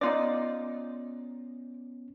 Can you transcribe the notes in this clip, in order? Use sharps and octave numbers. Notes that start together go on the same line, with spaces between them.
B3 C#4 D#4 F4 D5